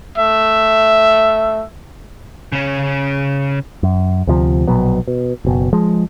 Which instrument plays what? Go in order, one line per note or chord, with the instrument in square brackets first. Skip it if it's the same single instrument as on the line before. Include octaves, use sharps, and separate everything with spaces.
[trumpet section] A3 E5
[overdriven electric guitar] C#3 C#4
[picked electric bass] F#2
D2 C3 F3
A#1 B2 F#3 B3
B2
F#1 B2
F3 G#3